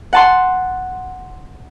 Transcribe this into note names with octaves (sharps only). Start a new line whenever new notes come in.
F#5 A5 C6